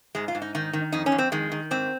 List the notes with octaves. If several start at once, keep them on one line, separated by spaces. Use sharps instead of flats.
G#2 G#3
F4
G#2
D#4
D#3 D#4
D#3
F2 D#4
C#4
F2
C4
D#3 G#3
D#3
G#2 C4